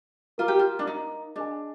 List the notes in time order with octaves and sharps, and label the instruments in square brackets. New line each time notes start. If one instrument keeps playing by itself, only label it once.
[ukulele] F4 [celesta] A#4 F5 A#5 D6
[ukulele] G4
F4
D4
D#4
[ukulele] D4 [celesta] G#4 D#5 G#5